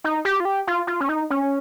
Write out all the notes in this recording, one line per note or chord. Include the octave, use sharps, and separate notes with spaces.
D#4
G4
F4
G4
F4
F4
C#4
D#4
C#4